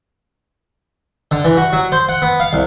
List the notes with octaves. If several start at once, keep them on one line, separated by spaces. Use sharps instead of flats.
D3
E3
F#4
F#3
C5
F#5
B3
F5
C2